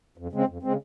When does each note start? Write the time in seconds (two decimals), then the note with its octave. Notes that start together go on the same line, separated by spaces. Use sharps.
0.18 F2
0.33 C#3 G#3 C4
0.48 F2
0.63 C#3 G#3 C4